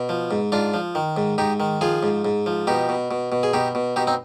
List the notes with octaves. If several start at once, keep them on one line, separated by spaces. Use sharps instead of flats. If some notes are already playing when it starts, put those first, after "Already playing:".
Already playing: B2
F3
G#2
G#2 D4 F4
F3
D#3
G#2
G#2 D#4 G4
D#3
F3 F4 G#4
G#2
G#2
F3
B2 D#4 G4
B2
B2
B2
G#4
B2 D#4 G4
B2
B2 D#4 G4
C4 D#4